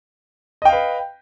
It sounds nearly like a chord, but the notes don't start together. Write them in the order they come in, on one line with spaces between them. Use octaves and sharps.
D#5 G5 F5 B4